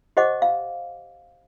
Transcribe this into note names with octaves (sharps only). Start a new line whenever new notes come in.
G4 C5 D#5 F#5 D6
F5